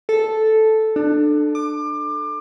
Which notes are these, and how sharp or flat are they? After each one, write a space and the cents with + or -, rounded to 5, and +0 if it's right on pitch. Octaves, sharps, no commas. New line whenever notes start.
A4 -5
D4 +25
D6 +25